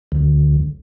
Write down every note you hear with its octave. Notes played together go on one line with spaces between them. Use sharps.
D2